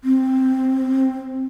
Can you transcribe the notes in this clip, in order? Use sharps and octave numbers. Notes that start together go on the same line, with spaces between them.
C4